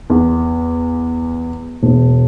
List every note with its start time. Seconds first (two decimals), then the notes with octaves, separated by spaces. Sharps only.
0.10 E2
1.83 E1